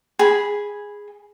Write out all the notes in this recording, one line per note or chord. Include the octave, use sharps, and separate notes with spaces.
G#4 B5